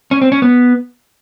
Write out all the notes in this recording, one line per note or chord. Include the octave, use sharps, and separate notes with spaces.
C#4
C4
C#4
B3